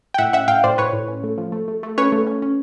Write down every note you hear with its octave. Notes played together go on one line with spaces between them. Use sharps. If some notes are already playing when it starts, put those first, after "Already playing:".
G5
A2 E5 F#5
C#4 E5 F#5
A2 F5 G5
A2 C5 D5
A2 B4 C#5
A2
C#4
A3
F3
A3
A3
A3
C#4 B4 C#5
A3
C#4
C#4